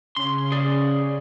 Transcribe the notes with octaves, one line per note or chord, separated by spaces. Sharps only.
C#3 C#4 C6
G#4 D5